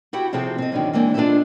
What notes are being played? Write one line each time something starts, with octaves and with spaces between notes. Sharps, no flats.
E4 F#4 G4 F#5 G5
C3 F3 C4 G#4 A4
C4 D#5
F#2 D3 D#3
E3 G#3 A#3 C4 D4
D4 F4 A4 B4 D#5 E5